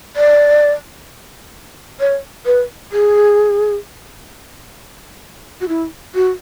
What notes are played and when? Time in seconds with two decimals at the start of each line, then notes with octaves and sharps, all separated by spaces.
0.16 D5
2.00 C#5
2.46 B4
2.92 G#4
5.61 F#4
5.68 E4
6.15 F#4